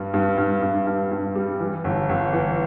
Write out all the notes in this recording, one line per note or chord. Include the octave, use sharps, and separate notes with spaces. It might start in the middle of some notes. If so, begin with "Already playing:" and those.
Already playing: G2 G3
G2
G2
G2
G2
G2
G3
E3
G1
G1
E3